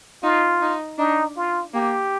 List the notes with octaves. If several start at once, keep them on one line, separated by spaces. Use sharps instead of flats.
D#4 F4
D#4
D4 D#4
F4
A#3 G4